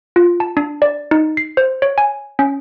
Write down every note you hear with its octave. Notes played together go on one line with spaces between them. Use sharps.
F4
A5
D4
D5
D#4
C7
C5
C#5
G#5
C#4